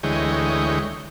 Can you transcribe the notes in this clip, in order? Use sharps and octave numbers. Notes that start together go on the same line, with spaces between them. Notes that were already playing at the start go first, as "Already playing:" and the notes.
D2 E3 G#3 C#5 D#5 G5